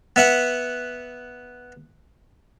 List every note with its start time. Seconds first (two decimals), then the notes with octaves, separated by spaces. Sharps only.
0.16 B3 E5 F#5